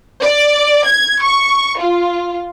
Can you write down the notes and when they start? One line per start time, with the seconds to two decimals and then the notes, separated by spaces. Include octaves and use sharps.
0.22 D5
0.86 G#6
1.22 C#6
1.79 F4